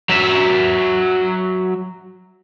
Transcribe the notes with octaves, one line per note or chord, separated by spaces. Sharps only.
F#3 E5